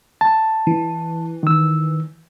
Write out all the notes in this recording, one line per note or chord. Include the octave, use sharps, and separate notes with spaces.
A5
E3
D#3 E6